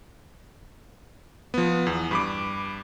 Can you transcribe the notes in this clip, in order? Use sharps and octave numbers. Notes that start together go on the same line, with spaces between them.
F3 B3
E2
G2 B5 D6